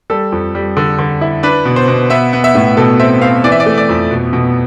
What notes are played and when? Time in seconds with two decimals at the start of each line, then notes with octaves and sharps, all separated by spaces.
0.10 G3 A4
0.32 F2
0.55 G3
0.77 D3
0.99 D3
1.21 E4
1.43 D4 B4
1.65 B2
1.76 C5
1.88 B2
2.10 B3 E5
2.33 B3
2.44 E5
2.55 A2
2.77 B2 A4
2.99 C4 E5
3.22 C4 F5
3.44 E3 D5
3.52 E5
3.60 D5
3.66 A3
3.77 D5
3.89 F2
4.11 B2
4.33 B2